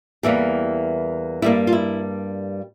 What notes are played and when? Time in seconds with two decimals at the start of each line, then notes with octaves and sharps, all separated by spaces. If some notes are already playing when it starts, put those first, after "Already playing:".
0.23 E2 E3 G3 A#3 G4
1.42 G2 G3 A#3 E4
1.67 F4
1.73 E4